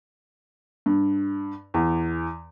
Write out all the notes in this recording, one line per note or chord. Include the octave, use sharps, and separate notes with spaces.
G2
E2